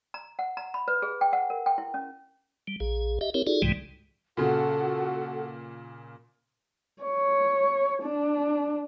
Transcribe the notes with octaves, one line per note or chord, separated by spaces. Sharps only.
A#5
F#5
A#5
B5
B4
G#4
G5
F#5
A#4
G5
E4
C#4
G3
A#1 G#4
G4 D#5 E5
C4 E4 G4 A#4 C#5
D#4 F4 F#4 G#4 A4 D5
C2 G#2 C3 E3 G3 G#3
A#2 C#3 F#4 A4 F#5
C#5
D4